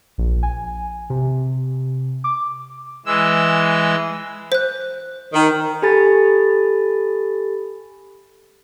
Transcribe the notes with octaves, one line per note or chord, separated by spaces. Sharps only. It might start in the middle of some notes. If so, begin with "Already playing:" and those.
A#1
G#5
C3
D6
E3 G#3 E6
C5 F#6
D#3
G4 A4 G#5 B5 A6